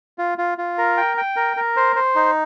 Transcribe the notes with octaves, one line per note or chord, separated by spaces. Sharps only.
F4
F4
F4
A#4
G5
G5
A#4
A#4
C5
C5
D#4